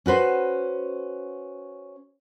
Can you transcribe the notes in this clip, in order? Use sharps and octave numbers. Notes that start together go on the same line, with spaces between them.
C#4 F#4 B4 C5